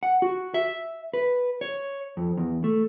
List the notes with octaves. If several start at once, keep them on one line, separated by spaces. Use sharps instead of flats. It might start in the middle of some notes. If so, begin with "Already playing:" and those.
F#5
F#4
E5
B4
C#5
F2
E2
A3